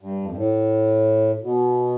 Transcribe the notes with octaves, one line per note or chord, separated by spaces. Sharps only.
G2
F2
G2
A2
B2